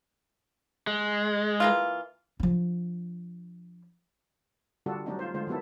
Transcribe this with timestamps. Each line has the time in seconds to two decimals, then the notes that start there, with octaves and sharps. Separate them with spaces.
0.87 G#3
1.60 E3 A#3 F4
2.40 F3 D4
4.86 D3 G3 D4 F4 F#4 A4
5.06 F#3 G3 A3 C4 D4 D#4
5.19 F4 C5
5.34 D3 G#3 F4 C5
5.47 D#3 F#3 B3 E4 A4